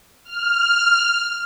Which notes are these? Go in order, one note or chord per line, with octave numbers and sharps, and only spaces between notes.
F6